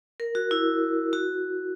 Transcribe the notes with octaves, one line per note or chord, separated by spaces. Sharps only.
A#4
F#4
E4
F#4